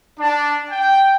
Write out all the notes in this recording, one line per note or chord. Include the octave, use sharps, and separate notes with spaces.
D4
G5